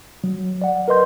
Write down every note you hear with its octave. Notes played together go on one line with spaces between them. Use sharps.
F#3
D5 F#5
A#4 B4 D#5 C6 G6